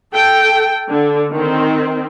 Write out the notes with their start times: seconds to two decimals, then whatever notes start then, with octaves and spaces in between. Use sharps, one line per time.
0.13 A4 G5
0.90 D3
1.33 D#3 C4